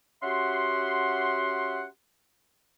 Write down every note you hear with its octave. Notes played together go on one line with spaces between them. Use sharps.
C#4 F#4 G4 E5 F#5 C6